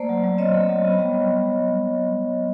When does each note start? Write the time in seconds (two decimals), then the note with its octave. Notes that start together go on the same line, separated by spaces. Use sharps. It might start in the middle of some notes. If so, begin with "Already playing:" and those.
Already playing: A3 A#3 C5 D5
0.09 F#3
0.24 F#3
0.38 C4 C#5 D#5
0.53 A3
0.69 F#3
0.84 B3
0.99 G3
1.13 G3